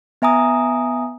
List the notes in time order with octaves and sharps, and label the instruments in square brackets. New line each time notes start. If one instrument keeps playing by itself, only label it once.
[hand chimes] B3 E5 G#5 A#5 D#6